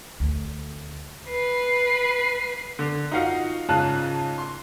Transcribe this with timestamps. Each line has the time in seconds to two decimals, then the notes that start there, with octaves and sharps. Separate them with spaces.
0.20 D2
1.28 B4 C7
2.79 D3
3.11 D#4 F4 F#4 F5 F#5
3.68 G#2 C#3 F4 A5 F#6
4.38 C6